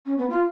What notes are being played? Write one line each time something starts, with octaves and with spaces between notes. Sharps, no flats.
C#4
B3
F4